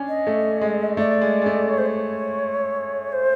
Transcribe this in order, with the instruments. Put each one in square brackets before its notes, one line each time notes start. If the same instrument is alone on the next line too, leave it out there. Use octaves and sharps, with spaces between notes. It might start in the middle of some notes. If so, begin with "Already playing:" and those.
Already playing: [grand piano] C#4 D4
[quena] D#5
[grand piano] A3
G#3
[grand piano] A3 [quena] D5
[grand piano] G#3
G#3
A3
[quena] C#5
C5
C#5
C5